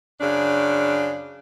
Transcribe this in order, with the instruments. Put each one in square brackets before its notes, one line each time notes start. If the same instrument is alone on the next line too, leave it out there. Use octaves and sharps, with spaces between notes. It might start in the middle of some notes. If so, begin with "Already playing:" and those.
[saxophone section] F#2 C#3 D4